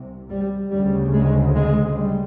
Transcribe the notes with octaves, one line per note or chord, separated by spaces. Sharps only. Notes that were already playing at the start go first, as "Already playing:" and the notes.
Already playing: C2 C3
G3
D2 C#3 G3
G#3
G#3
G3